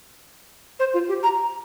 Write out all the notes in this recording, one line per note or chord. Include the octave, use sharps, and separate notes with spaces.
C5
F4
G4
A#5